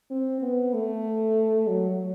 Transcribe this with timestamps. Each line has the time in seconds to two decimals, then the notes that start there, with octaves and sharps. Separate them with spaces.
0.11 C4
0.42 B3
0.74 A3
1.68 F#3